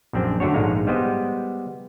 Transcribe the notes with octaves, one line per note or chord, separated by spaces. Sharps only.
A#1 F#2 C4 D4
D3 A3 D4 F#4 C#5
A#1 G#2 G#3 F5 A#5
G3 G#3 B3 C5 D#5